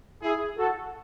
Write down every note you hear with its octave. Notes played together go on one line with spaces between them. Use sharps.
E4 G#4
F#4 A4